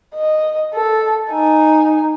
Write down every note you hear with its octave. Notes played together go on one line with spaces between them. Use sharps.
D#5
A4
D#4 G#5